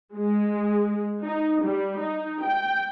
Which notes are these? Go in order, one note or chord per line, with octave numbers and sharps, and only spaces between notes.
G#3
D#4
G3
D#4
G5